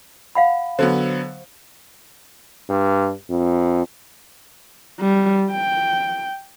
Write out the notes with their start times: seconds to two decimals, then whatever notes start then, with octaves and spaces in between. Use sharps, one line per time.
0.35 F5 F#5 B5
0.79 D3 F#3 B3 C5
2.69 G2
3.30 F2
5.00 G3
5.51 G5